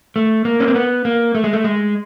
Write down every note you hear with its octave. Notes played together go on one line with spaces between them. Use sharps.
A3
A#3
C#4
C4
B3
A#3
A3
G#3
A3
G#3